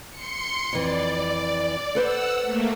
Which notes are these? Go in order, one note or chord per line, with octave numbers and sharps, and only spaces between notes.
C6 C#7
F2 E3 D5
A4 B4 C5 F#5 E6
A3 A#3